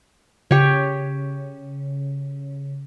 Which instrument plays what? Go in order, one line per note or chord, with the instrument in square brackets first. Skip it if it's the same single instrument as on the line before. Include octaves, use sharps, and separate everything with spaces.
[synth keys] C#3 [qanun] G4 C#5